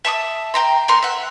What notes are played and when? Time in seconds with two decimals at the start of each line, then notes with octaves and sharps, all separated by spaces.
0.05 E5 A5 C#6 D#6
0.54 G5 A#5 C6
0.88 A3 A4 A#4 C6
1.02 E5 F#5